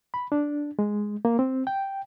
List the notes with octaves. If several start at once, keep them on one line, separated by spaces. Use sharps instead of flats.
B5
D4
G#3
A#3
C4
G5